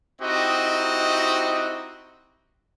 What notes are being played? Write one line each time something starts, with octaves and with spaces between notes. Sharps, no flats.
C4 D#4 E4 F#4 G4 D#5